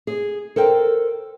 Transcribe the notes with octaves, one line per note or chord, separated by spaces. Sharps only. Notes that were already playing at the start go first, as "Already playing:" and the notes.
G#4
A4 A#4 C5 G5